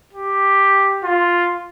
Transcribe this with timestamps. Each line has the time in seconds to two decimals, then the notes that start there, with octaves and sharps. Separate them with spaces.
0.13 G4
1.04 F4